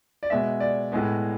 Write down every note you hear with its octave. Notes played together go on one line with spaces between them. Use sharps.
D5
B2 G#3 B3 E5
D5
A2 G#3 B3